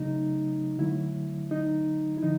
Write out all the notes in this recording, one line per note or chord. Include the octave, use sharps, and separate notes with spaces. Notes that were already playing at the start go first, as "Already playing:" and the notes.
Already playing: C#3 F#3 A3 D#4
D3 F#3 A3 E4
D#4
E4
D3 F3 D#4